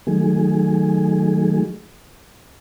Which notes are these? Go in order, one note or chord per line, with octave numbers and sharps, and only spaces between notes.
D#3 F#3 A3 G#4